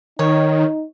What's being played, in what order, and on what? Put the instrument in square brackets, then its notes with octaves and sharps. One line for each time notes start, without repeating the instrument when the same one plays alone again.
[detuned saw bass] D#3 [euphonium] D#4 [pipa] C#5